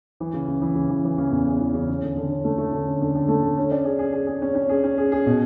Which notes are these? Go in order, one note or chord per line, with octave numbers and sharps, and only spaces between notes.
E3
C#3
C#3
E3
C#3
E3
E3
C#3
E2
E2
E3
C#3
C#4
D3
D3
C#4
A3
A3
D3
C#4
D3
D3
A3
D3
C#4
D5
G#4
G#4
G#4
G#4
C#4
C#4
G#4
C#4
G#4
G#4
B2